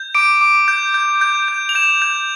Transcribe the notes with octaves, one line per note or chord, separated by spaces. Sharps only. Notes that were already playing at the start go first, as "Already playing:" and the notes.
Already playing: G6
D6 D7
D6
G6
G6
G6
G6
F7
G6 E7
G6